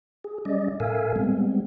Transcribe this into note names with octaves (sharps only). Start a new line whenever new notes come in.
G#4
G3 C#4 D5 D#5
A2 A4 A#4 E5 F5 G#5
G3 G#3 B3 C4